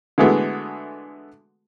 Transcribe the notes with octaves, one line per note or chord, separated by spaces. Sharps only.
D3 E3 G#3 A3 B3 F#4